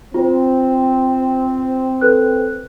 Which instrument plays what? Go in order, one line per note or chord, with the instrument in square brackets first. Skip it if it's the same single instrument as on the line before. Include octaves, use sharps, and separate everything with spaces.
[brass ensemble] C4 [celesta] F4 C5
[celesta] A4 B4 F#6